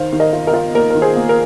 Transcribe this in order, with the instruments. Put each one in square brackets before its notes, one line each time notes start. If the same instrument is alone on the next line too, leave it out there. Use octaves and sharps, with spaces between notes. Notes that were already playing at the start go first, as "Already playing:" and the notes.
Already playing: [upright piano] D#3 C5 F5
D#3
A#4 D#5
F4
A#4 D#5
F4
A#3 A#4
D#3 A#4
G#4 C5
A#3
A#4